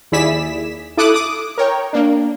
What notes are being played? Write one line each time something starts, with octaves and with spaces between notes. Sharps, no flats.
D#2 E4 G#4 D5 B6 E7
E4 A4 D6 D#6 F#6
D6 D#6
A#4 C#5 G5
A#3 D4